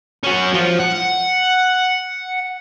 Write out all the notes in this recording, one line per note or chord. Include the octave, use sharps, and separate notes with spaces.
C#4 F#4
F3 F4
F#5